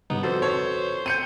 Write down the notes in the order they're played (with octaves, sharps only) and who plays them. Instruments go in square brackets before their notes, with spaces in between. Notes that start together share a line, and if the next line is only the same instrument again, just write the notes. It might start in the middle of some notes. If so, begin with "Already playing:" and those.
[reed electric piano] G#2 C#3 G3 [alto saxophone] B3 [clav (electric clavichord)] D#4
[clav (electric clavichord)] F2 A4 A5 [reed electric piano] F#4 B4 [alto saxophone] C5
[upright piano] C#5
[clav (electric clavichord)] C4 [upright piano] G6 C#7 D#7